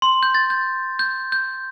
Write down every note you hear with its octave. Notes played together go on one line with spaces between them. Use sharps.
C6
G6
A6
G6
G6
G6